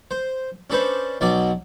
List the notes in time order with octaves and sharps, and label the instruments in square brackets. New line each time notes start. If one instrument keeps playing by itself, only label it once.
[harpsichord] C5
C#4 D4 A4 B4 C5
B1 B2 F#3 D5 D6